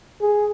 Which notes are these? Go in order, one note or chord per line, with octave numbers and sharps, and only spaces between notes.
G#4